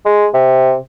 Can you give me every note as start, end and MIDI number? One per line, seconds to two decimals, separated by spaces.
0.05 0.27 56
0.34 0.75 48